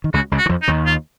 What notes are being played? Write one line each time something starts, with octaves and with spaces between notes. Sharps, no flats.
D#3
C#2 C#3 F#4
C#2 C#3
F#4
D#3
F2 F3
D#4
D#2 D#3
F4